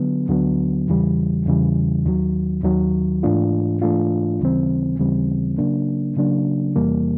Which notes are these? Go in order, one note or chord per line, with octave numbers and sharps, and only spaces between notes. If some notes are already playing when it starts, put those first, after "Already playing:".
Already playing: D3 F#3 B3
D2 D3 F#3 B3
E2 C#3 E3 G3
E2 C#3 E3 G3
D#2 D#3 F#3
D#2 D#3 F#3
G#2 E3 A3 D4 F4
G#2 E3 A3 D4 F4
D#2 C#3 E3 G3 C4
D#2 C#3 E3 G3 C4
C#3 F#3 A#3 D4
C#3 F#3 A#3 D4
E2 C3 E3 G3 A#3